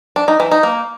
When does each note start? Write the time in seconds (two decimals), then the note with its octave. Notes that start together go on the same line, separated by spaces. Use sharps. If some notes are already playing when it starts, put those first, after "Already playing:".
0.16 D4
0.28 D#4
0.40 E3
0.51 D#4
0.63 A#3